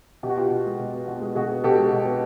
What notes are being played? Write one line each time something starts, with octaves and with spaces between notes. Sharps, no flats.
B2 G4
F#4
B3 F4 G4
B2
G#3
B2
B3
B2
G#3
B2 F#4 G#4
B3
B2 G4 A4
G#3
B2
B3